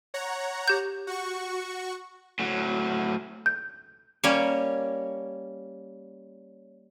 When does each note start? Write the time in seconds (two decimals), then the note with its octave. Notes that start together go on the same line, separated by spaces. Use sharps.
0.14 C#5 F#5 A#5
0.68 G4 G6
1.07 F#4 C#6
2.39 A2 F#3
3.46 G6
4.24 G3 A#3 C#4 C#5